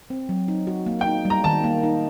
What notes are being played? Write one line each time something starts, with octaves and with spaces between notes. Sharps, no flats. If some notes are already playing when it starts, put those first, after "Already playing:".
C4
F#3
D#4
F#4
A#3
G5
D#4
G3
A#5
D#3 A5
A#3
D#4